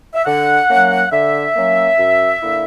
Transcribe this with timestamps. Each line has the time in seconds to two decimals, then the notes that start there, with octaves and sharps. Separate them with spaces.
0.15 E5
0.26 D3 F#5
0.69 F#3 A#3 C#4
1.12 D3 E5
1.55 F#3 A#3 C#4
1.98 F#2
2.40 D3 A#3 E4